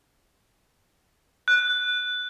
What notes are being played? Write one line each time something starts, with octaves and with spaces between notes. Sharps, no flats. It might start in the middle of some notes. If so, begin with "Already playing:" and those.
F#6